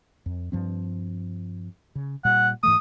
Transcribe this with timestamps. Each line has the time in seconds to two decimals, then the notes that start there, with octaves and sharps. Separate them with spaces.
0.26 F2
0.52 G2 F3 C4
1.95 C#3
2.25 A#2 G3 F#5
2.63 G#2 E3 A3 D#6